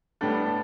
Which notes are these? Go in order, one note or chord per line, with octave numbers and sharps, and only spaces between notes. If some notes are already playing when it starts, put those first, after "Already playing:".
A2 G3 B3 D4 A4